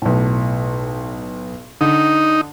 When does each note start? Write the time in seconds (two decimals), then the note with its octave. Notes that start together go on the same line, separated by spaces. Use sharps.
0.02 B1 A2
1.81 D3 D#4